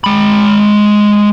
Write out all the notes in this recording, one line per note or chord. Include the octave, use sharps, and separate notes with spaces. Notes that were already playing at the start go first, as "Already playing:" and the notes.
G#3 B5